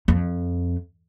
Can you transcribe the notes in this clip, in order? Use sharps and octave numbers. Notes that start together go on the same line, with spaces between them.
F2